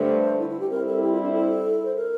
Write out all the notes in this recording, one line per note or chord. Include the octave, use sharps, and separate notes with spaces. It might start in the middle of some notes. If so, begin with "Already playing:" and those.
Already playing: G2 D3 A3 C5
E4
E4
G4
G3 C4 E4 A#4
A4
G4
F4
D4
A4
C5
A#4